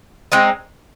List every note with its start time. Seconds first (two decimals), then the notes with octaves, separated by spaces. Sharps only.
0.32 G#3 C4 D#4